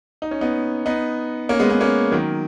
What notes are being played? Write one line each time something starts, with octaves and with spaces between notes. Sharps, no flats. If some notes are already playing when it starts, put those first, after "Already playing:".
D#4
C#4
B3 D#4
B3 D#4
A#3 C#4
G#3 B3
G#3 B3
A#3 C#4
D#3 F#3